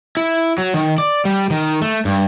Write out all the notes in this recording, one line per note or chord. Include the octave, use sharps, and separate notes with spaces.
E4
F#3
D#3
D5
G3
D#3
A3
G2